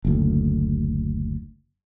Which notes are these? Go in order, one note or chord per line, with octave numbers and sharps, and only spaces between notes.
F#1 D2